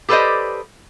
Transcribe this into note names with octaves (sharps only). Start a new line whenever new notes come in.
G4 A4 B4 C5 D5 D#5